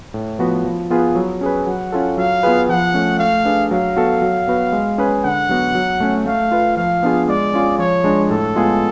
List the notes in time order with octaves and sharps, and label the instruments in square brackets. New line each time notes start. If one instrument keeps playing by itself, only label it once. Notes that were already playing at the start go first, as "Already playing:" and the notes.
[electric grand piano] A2
F3 B3 F#4 B4
F3
B3 F4 G#4 B4
F#3
C#4 G#4 B4
[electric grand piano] F#3 [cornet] F#5
[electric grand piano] C#4 F4 A4
[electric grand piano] F#3 [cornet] F5
[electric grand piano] B3 F4 G#4 B4
[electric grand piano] F3 [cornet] F#5
[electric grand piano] A3 C#4
[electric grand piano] A3 [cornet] F5
[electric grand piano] D4 G#4 B4
[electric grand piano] F#3 [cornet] F5
[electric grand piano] B3 F#4 A4
F#3
B3 F#4 B4
G#3
C#4 G#4 B4
[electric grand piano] D3 [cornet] F#5
[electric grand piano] F#3 B3 F#4
F#3
A3 C#4
[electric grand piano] A3 [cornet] F5
[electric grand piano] F4 B4
[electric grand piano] F3 [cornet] F5
[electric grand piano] B3 D4 F4 G#4
[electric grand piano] G#3 [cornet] D5
[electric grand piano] C#4 F4 G#4
[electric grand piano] F3 [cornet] C#5
[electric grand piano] G#3 D4
[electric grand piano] A2 [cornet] A4
[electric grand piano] G#3 B3 F4 G#4